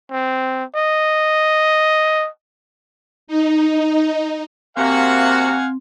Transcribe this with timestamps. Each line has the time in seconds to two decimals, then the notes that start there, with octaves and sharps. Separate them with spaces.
0.11 C4
0.76 D#5
3.27 D#4
4.77 C3 A#3 C4 F#4 F5 F#5 G#5